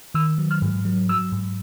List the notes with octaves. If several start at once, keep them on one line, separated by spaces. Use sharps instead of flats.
D#3 E6
F#3
F6
G#2
F#3
F#3 E6
G#2